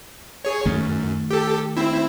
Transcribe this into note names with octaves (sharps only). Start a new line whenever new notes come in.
G#4 C#5
F#2 D#3 A3
G4 A4
C4 E4